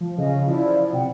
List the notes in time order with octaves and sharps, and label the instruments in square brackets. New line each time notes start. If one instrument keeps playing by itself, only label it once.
[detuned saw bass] F3
[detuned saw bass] C#3 [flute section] C#4 D#5 F5
[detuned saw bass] F3 [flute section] E4 D5
[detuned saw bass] C3 [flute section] F#5 G5